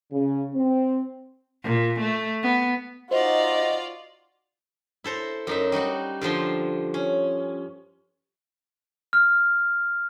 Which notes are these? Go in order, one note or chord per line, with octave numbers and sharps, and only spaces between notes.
C#3
C4
A#2
A3
B3
D#4 F4 F#4 C5 D5 D#5
E4 A4 C5 A#5
F#2 D#4 E5
G3 D#4 F#4 F#5
G2 D3 F3 C5
C#4
F6